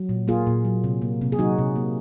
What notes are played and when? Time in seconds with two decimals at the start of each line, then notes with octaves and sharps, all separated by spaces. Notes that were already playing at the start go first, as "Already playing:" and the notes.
Already playing: F#3
0.09 A#2
0.28 A#3 F4 G#4
0.47 A#2
0.65 F#3
0.84 C3
1.02 A#3
1.21 C3
1.32 G#4
1.39 F#3 D#4 F#4
1.58 C3
1.76 A#3